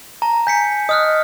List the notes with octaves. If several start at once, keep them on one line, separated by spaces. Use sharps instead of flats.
A5 A#5
G#5 G6 B6 C#7
D#5 D#6 F6 F#6